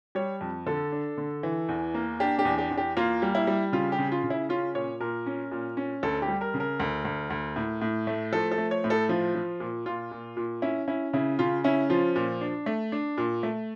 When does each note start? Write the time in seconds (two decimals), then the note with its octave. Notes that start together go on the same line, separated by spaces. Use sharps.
0.15 G3 C#5
0.41 F2
0.66 D3 A4
0.92 D4
1.18 D3
1.43 E3
1.69 E2
1.94 A#3
2.20 D4 G4
2.39 G4
2.45 E2
2.58 G4
2.70 E2
2.77 G4
2.97 A#3 F4
3.22 G3
3.35 E4
3.47 G3
3.72 C#3 F4
3.92 G4
3.99 C#3
4.12 F4
4.24 C#3
4.30 E4
4.49 C#4 F4
4.75 A#2 C#5
5.00 A#2 A#4
5.26 C#4
5.51 A#2
5.77 C#4
6.03 D2 A4
6.22 G4
6.28 G3
6.41 A#4
6.54 C#3
6.60 A#4
6.80 D2
7.05 D2
7.30 D2
7.56 A2
7.81 A2
8.07 A3
8.32 F3 A4
8.51 A4
8.58 A3
8.71 C#5
8.84 A2
8.90 A4
9.09 F3 F4
9.35 F3
9.60 A#2
9.86 A#2 F4
10.11 A#2
10.37 A#2
10.62 C#4 E4
10.88 C#4 E4
11.13 C#3 E4
11.39 C#3 F4
11.64 C#4 E4
11.90 F3 F4
12.16 A#2
12.41 D4
12.66 A3
12.92 D4
13.18 A#2
13.43 A3